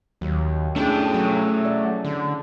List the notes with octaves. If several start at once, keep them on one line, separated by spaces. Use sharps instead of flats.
D#2 F#3
A3 C#4 D4 E4 G#4 G5
F#3
D5
D3